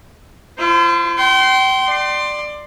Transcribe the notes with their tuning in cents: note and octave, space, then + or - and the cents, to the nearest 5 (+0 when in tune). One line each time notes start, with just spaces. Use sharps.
F4 -45 C5 +5
G5 -35 C6 +0
D5 +20 C6 +0